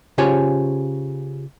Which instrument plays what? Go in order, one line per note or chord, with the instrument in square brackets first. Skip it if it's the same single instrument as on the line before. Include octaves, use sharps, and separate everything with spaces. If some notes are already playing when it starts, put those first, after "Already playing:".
[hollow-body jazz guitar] C#3 F4 G4 C5 C#5 G#5